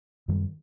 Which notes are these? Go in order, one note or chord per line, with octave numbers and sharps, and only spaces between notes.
F#2 D#3 G3